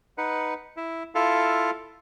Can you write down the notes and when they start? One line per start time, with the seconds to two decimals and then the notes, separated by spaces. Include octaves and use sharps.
0.18 D#4 B4 F#5
0.77 E4
1.15 E4 F4 A4 F5